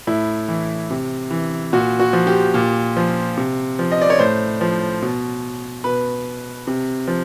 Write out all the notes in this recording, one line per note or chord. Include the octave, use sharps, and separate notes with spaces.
A2 E4
E3
C3
E3
A#2 F#4
F#4
F3
G4
A#2
F3
C3
F3
D#5
D5
C#5
A2 C5
F3
B2
B2 B4
C3
F3